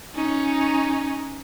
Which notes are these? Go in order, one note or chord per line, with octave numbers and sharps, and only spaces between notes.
C#4 D#4